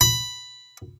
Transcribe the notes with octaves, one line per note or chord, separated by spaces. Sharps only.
B5